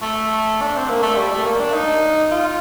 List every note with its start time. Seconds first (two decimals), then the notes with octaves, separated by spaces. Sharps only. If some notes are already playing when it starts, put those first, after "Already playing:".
0.02 A3
0.62 D4
0.76 C4
0.89 A#3
1.03 A3
1.16 G3
1.32 A3
1.45 A#3
1.59 D4
1.74 D#4
2.31 F4